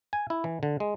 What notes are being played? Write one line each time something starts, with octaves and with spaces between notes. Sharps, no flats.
G#5
E4
E3
D3
G#3